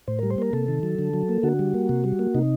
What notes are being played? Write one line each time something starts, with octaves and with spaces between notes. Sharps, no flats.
A2 C5
G3 A#4
C5
A#3 A#4
C3 A4
D#3
F#3
D3
F#3
A#3
D3 F#4
G3
A#3
C3
G3
A#3
C3 D#4